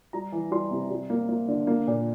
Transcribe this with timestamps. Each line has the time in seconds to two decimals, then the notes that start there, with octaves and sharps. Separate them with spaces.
0.13 G3 A#5
0.32 E3
0.52 G3 C6
0.71 C3
0.91 G3
1.10 A#3
1.29 A#3
1.48 D3
1.67 A#3
1.87 A#2